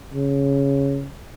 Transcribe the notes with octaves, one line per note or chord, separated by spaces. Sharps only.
C#3